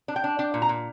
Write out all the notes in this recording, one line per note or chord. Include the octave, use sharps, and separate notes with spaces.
D4
G5
D4
D4 G5
A#2
A#5
A#2